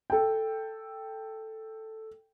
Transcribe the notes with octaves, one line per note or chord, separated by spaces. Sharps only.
A4 G5